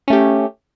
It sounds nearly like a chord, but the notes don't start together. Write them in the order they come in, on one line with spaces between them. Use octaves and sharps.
C#4 A3 G4